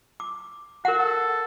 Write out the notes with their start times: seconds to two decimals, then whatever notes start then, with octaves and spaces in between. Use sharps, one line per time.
0.20 D6
0.85 F#4 A#4 F#5
0.98 A4